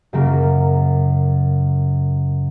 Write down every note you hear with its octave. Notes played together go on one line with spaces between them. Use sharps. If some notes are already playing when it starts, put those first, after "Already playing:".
F#2 C#3 A#3